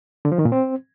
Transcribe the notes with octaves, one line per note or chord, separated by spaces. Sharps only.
D3
F3
D#3
A#2
C4